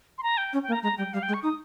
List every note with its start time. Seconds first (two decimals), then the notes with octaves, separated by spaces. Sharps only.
0.18 C6
0.23 A#5
0.37 G5
0.53 C#4
0.63 G5
0.68 A#3
0.72 A#5
0.83 G#3 A#5
0.98 G3 G5
1.13 G3 F5
1.23 G5
1.28 G#3
1.34 C#6
1.43 D#4 D#6